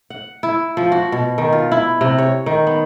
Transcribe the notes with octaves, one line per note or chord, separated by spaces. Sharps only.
F#5
E4
F3
F#4
B2
D#3
F4
E4
C3
C#5
D#3
B3